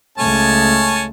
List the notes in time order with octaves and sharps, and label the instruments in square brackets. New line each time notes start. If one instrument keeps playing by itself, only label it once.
[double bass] C#2 A3 [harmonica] C#4 G#5 A5